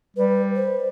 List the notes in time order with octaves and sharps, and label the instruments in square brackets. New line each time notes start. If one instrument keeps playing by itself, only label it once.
[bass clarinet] G3 [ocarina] B4
[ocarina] C5